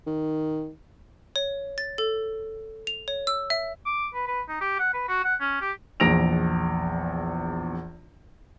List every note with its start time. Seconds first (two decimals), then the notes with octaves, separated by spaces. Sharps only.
0.07 D#3
1.36 C#5
1.78 A6
1.98 A4
2.87 F7
3.08 C#5
3.27 E6
3.50 E5
3.86 D6
4.14 B4
4.28 B4
4.49 D#4
4.61 G4
4.79 F#5
4.94 B4
5.08 F#4
5.24 F#5
5.41 C#4
5.61 G4
6.00 A#1 E2 A#6 D7 F7